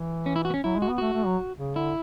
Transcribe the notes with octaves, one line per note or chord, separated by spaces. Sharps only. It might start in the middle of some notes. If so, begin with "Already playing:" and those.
Already playing: E3
C#4
E4
F#4
B3
C#4
F#3 E4
G#3
F#4
B3
A3 F#4
A3
F#3
C#3
D3 E4